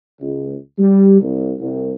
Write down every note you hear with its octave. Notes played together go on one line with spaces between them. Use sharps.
C#2
G3
C2
C2